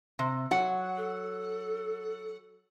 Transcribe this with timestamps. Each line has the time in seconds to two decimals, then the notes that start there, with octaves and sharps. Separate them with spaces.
0.19 C3
0.51 F#3 F#5
0.97 A4